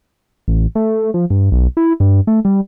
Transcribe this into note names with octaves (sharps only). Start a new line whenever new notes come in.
A1
A3
F3
G2
B1
E4
G2
A3
G3